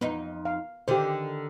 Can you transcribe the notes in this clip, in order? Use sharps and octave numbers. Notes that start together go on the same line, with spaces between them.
F2 B3 D#4
F5
D3 D#3 G4 C5